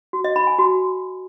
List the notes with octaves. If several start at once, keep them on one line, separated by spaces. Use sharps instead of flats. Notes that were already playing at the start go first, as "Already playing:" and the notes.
F#4
D#5
B5
G#5
F#4